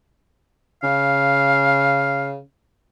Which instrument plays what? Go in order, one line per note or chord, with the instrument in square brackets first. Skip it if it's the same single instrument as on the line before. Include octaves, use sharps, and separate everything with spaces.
[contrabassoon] C#3 [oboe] F5